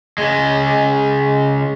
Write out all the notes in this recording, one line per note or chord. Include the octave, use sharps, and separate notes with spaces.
C#3 G#3